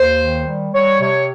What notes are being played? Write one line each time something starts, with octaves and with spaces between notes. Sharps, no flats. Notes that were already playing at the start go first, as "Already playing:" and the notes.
Already playing: D#2 C5
D#3
G3
G3 C#5
C3 C#5